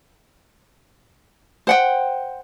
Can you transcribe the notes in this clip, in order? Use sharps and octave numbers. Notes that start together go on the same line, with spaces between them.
C5 F#5 G5